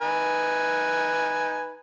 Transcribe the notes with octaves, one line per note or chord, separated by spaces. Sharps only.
D#4 B4 G#5